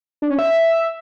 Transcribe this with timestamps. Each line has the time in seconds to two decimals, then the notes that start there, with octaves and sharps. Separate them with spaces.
0.22 D4
0.30 C#4
0.39 E5